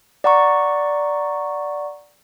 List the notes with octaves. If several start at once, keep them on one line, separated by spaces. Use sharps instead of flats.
D5 F#5 A#5 C#6